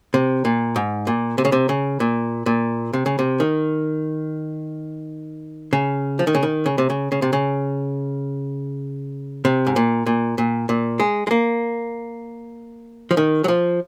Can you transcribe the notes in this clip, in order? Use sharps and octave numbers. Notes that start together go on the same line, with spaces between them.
C3
A#2
G#2
A#2
C3
C#3
C3
C#3
A#2
A#2
C3
C#3
C3
D#3
C#3
F3
D#3
C#3
D#3
C#3
C3
C#3
C#3
C3
C#3
C3
G#2
A#2
A#2
A#2
A#2
G#3
G#3
A#3
F3
D#3
F#3
F3